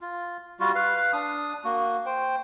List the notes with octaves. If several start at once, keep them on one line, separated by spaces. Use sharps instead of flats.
F4
G3 F4 F#4
B4 F5
D4 D#6
A#3 F#4
C5 G5